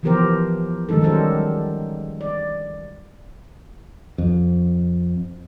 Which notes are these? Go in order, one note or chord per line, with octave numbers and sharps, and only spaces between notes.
E3 F3 B3 G4 A#4 C5
D#3 G3 G#3 D#4 A4
F#3 G3 C#4 A4 A#4 C5
D5
F2